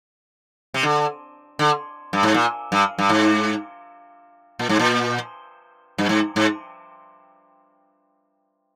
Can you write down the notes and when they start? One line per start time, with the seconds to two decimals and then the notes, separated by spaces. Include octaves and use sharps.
0.74 C3
0.83 D3
1.59 D3
2.13 G2
2.23 G#2
2.34 A#2
2.72 G2
2.99 G2
3.10 G#2
4.59 A#2
4.69 G#2
4.79 A#2
5.98 G2
6.09 G#2
6.36 G#2